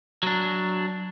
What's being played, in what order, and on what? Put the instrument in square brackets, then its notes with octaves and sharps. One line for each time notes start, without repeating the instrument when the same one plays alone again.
[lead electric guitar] F#3 D4